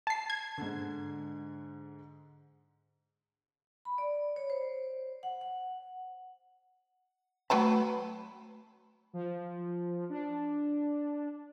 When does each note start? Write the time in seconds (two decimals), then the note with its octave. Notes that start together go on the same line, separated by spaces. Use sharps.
0.07 A5 C7
0.30 G#6
0.58 G#2 D3
3.85 B5
3.98 D5
4.36 C#5
4.50 C5
5.23 F#5
5.41 F#5
7.50 F#3 A3 B4 A5 B5
9.13 F3
10.10 D4